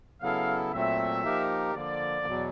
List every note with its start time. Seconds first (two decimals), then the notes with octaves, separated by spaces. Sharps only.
0.21 C#3 F#3 B3 E4 A4 F5
0.72 A#2 F#3 A3 C4 E5
1.24 F3 A#3 D#4 G4 A#4
1.74 D3 F3 A#3 D5
2.26 E2 B2 F#3